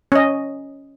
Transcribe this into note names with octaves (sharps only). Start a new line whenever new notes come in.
C#4 D#5